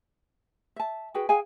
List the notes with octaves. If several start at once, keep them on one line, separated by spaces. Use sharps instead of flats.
E5 A5
F#4 G#4 B4 G5
G#4 F5 G5 G#5